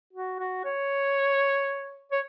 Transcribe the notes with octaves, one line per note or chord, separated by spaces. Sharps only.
F#4
F#4
C#5
C#5